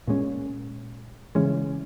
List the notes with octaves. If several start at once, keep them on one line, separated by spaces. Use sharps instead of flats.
A#2 G#3 C#4
C#3 E3 G#3 C#4